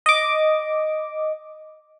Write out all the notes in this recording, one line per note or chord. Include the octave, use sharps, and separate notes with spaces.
D#5 D6